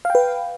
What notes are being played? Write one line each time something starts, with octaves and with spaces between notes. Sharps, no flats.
B4 F5 G5